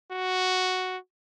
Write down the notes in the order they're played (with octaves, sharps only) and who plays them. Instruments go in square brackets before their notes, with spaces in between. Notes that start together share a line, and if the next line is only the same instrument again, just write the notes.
[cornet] F#4